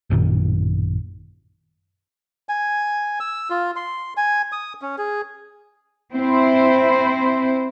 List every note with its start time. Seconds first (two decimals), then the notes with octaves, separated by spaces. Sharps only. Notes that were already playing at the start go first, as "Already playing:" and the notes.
0.10 A1 F#2 A#2 D#3
2.49 G#5
3.20 E6
3.50 F4
3.76 C6
4.17 G#5
4.52 D#6
4.82 C#4
4.98 G#4
6.13 C4 E4 C5